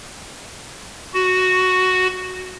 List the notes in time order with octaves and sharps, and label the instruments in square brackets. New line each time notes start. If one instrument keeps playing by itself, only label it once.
[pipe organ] F#4